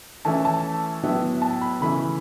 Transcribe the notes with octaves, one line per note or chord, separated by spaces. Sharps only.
E3 A3 C#4 E4 A5
A5
A2 F#3 B3 E4
A5
B5
C#3 E3 A3 E4 B5